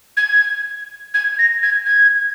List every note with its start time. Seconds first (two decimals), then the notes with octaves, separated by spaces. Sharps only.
0.17 G#6
1.14 G#6
1.38 A#6
1.63 G#6
1.86 G#6